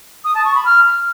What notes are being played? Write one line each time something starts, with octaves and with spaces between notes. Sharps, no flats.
D#6
A5
C#6
B5
F6